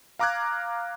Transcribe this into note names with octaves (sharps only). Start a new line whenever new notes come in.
F5 A#5 D6 F6 F#6 G#6